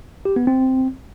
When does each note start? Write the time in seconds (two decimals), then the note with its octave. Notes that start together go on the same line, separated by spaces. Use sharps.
0.25 G4
0.36 B3
0.47 C4